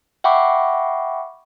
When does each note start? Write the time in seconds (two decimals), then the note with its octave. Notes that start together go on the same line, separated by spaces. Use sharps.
0.24 E5 F#5 G5 B5 C#6 D6